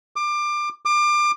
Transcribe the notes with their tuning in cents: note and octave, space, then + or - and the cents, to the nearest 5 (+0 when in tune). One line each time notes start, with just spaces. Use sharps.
D6 +25
D6 +30